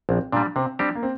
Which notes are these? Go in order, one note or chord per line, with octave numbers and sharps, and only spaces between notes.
A#1 C4
A#2 G3 D4
C3 C4
G3 C4 D4 G4
A#3
C4